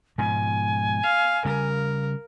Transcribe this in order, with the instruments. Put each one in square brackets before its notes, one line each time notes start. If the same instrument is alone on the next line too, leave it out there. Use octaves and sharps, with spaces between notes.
[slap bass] G#2 B2 F3 [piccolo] G#5
[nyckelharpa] F5
[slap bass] C#3 G3 [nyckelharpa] A#4